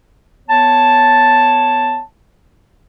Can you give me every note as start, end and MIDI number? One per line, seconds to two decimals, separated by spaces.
0.48 2.00 59
0.48 2.00 73
0.48 2.00 81